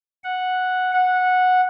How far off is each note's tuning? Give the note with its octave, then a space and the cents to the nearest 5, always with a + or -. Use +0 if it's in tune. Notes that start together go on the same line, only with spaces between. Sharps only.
F#5 -5
F#5 -10